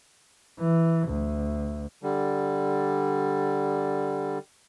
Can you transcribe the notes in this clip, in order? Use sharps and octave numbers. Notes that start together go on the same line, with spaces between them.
E3
D2
D3 G3